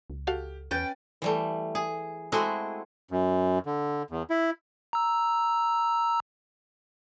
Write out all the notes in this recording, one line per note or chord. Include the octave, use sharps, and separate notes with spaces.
C#2
F#4 G4 A4 F5
E2 C#4 B4 G5 A6
E3 G3 A3
G#4
G#3 A3 C4 E4 F#4 G#4
F#2
D3
E2
E4
A#5 E6